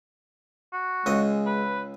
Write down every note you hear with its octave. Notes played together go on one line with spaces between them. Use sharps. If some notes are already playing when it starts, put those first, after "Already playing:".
F#4
C#2 G#3 D#5
B4